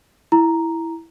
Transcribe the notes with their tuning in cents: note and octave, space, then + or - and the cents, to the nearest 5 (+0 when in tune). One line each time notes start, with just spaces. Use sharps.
E4 +0 A#5 +0